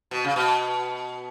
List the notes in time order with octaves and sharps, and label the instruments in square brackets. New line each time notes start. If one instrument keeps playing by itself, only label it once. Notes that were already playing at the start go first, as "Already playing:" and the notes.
[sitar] B2
C#3
B2